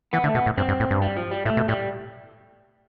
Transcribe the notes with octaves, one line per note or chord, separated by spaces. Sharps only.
E3 B3
D3 A3
B2 B3
A2
G2 C4
G2
A2
G2
G3
F3
G3
A2 A3
B2
A2 G3